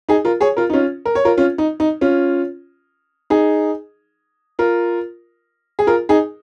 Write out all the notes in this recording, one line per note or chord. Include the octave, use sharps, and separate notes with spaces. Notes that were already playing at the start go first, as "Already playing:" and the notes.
D#4 G#4
F4 A#4
G#4 C#5
F4 A#4
D#4
C#4 F4
A#4
C#5
F4 A#4
C#4 F4
D#4
D#4
C#4 F4
D#4 G#4
F4 A#4
G#4
F4 A#4
D#4 G#4